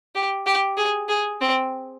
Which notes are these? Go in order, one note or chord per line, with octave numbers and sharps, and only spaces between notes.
G4
G4
G#4
G#4
C4